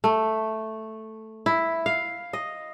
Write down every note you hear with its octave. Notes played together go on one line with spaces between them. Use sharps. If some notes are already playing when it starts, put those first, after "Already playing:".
A3
E4
F5
D#5